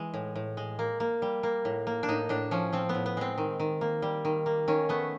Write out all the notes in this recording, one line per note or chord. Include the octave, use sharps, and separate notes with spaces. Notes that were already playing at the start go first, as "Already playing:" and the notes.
Already playing: E3 G#3
A2
A2
G#3
A#3
A#3
G3
A#3
A2
A#3
D4
A2 D#4
A2 D4
F3 C#4
F3 C4
B3
A2
B3
G#3 C4
D#3
D#3
A#3
G3
D#3
A#3
D#3 C#4
A3 B3